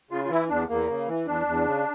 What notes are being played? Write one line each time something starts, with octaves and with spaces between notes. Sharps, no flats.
C#3 F4
F4
E3 E4
E2 D4
E2 A#3
C#3
E3
E2 D4
E2
C#3